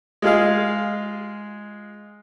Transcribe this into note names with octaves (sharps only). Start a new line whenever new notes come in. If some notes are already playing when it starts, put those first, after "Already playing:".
G#3 F4 G#4 F5